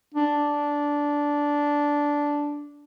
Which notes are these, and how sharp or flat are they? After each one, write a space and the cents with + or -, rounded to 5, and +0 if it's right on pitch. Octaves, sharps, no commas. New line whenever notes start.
D4 -10